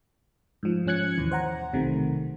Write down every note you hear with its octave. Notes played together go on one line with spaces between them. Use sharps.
G#2 F3
G#2 F3 C#4 F#6 G#6 C#7
D#2 B2 E3
C5 F#5 A#5
B1 C3 D#3 A3